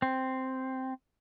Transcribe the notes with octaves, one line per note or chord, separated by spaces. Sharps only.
C4